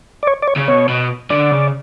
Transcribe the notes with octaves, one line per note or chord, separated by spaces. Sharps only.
D5
C#5
D5
C#5
C#3
B2 C#5
B2
D3 D5
C#3